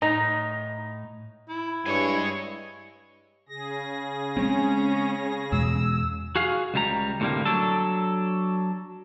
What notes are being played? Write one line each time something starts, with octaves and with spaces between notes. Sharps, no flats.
A2 D#4 D#5 A#5
E4
G2 G#3 C#5 G#5
C#3 G#4 A#6
G#3 A3 C4 C#4
E2 B2 G#3 E6
F#4 G#4 F5
C#2 G3 A#5
D2 A2 C3 F#3 G3 A#3
F#3 D4 A4